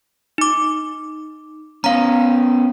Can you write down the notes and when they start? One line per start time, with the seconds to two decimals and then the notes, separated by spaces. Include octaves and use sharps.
0.38 D#4 D6
1.84 B3 C#4 F5 A#5